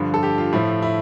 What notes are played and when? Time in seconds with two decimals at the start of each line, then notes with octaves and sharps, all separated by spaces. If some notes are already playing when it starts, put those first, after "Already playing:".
Already playing: G2 D3 F3
0.14 A4
0.23 G4
0.38 F4
0.52 A2 F3 E4
0.82 E4